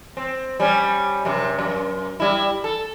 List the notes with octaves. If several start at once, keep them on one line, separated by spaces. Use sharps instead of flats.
C4
G3 C#4
F#2 C3
F#2
G3 E4
A4